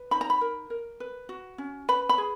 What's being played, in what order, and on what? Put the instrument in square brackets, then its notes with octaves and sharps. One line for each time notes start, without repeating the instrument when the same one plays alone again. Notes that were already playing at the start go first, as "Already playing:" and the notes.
Already playing: [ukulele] B4
D#4 B5
A#5
B5
A#4
A#4
B4
F#4
C#4
B4 B5
B5
G#4